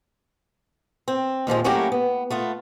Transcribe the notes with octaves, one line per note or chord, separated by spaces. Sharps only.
C4
D#2 A#2 F3 G#3
F#3 A3 A#3 C#4 E4 G4
B3
A3 B3 F4